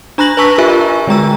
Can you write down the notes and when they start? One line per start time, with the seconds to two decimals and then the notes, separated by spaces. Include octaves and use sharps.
0.18 D4 A#5 B5 F#6 A#6 F#7
0.37 B4 G#5 A5 C#6 E6 B6
0.58 F4 G4 A#4 E5 G#5 C#6
1.07 D3 G#3 A#5 E6